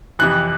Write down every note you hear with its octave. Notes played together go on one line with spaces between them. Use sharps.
F2 C3 E3 F#6